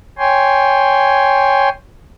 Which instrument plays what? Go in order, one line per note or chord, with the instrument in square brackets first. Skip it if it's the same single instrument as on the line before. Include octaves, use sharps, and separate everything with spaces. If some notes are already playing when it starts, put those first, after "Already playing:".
[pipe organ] C#5 G5 G#5 C6